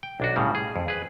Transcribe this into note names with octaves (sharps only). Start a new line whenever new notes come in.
G5
B1 D4 F#4
A2 C#3 G3
G#4
F2
G#4 B4